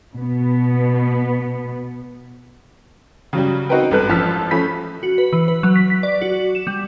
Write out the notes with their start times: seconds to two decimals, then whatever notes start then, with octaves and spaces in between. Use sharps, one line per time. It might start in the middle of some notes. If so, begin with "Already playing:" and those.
0.16 B2 B3
3.33 C#3 F#3 G3
3.69 C4 D#4 F#4 A#4 B4 G5
3.91 G#1 G2 A4 B4 F#6
4.09 A1 F3 A5 E6 F6 B6
4.51 F3 A3 C#4 B5 B6
5.03 F#4
5.18 B4
5.33 E3
5.48 B4
5.63 F#3
5.76 B6
5.90 B6
6.03 D5
6.22 F#4
6.55 E7
6.67 G3